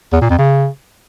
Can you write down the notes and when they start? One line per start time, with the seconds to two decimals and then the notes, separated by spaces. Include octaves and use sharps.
0.13 E2
0.21 A#2
0.30 F2
0.39 C#3